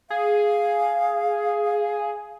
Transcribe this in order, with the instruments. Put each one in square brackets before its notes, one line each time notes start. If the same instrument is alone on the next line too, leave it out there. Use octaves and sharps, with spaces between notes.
[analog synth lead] G#4 [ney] F5